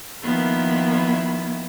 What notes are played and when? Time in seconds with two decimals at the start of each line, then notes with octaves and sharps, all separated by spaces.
0.23 D#3 F3 A#3 B3 E4